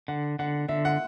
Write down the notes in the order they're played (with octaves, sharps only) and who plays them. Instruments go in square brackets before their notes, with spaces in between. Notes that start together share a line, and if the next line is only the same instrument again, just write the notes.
[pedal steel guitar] D3 [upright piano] F#5
[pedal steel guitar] D3 [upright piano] F#5
[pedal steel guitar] D3 [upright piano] E5
[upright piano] F#5